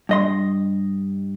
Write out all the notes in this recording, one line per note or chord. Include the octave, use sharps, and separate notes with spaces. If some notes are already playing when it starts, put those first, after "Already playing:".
G2 D#5 C6